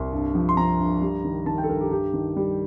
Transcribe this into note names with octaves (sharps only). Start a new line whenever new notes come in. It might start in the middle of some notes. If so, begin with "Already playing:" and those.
Already playing: C2 C6
G2
F3
C6
F3 A#5
G2
G3
D#3
D#3 A5
G5
A4
G2 A#4
G4
G2 G4
D#3
G3